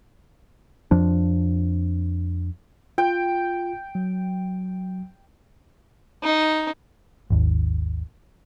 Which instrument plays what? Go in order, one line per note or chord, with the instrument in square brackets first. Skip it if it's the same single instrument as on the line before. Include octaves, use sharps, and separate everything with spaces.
[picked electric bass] F2 F3 D4
[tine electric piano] F4 [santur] G5
[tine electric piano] F#3
[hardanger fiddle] D#4
[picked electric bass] G#1 D#2